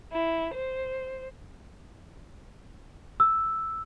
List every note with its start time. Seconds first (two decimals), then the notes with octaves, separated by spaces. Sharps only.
0.12 E4
0.53 C5
3.20 E6